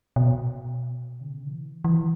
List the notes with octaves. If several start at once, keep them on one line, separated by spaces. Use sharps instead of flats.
B2
D3
C#3
D3
E3
E3